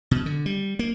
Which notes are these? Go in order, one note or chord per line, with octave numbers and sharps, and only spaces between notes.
B2
D3
G3
A#3